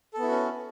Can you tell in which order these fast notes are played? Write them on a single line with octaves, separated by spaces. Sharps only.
A4 B3 E4 F#4 C#4